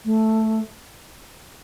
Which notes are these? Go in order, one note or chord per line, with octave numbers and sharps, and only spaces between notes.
A3